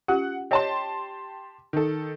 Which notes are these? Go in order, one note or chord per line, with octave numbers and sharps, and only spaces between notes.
C#4 F4 G4 F#5
G4 C#5 D#5 A5 C6
D#3 A4